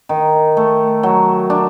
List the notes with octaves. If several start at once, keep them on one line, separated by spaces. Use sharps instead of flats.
D#3
A3
F#3
D4